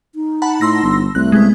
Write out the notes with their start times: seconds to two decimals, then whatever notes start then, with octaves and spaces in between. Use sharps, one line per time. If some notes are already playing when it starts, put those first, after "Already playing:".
0.15 D#4
0.42 F#5 A5 B5
0.61 A2 C6 E6 A#6
0.83 G1
1.15 C2 A3 F#6
1.32 G#3 B3